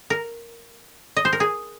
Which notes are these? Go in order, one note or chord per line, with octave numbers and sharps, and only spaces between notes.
A#4
D#5
C5
A#4
G#4